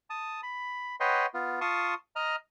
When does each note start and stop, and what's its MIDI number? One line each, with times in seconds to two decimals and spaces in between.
0.10 0.41 81
0.10 0.41 87
0.43 0.96 83
1.00 1.26 71
1.00 1.26 73
1.00 1.26 75
1.00 1.26 78
1.00 1.26 79
1.00 1.26 84
1.34 1.60 59
1.34 1.60 65
1.61 1.94 65
1.61 1.94 81
1.61 1.94 84
1.61 1.94 85
1.61 1.94 87
2.16 2.36 75
2.16 2.36 82
2.16 2.36 89